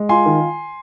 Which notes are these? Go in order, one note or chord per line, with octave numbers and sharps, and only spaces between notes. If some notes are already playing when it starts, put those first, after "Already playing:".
Already playing: G#3
F4 G#5 C6
D#3